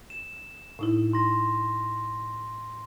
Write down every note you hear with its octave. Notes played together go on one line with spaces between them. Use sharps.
E7
A2 D#4 E4
C6 A#6